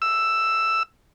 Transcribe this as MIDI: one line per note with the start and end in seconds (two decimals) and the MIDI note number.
0.02 0.83 88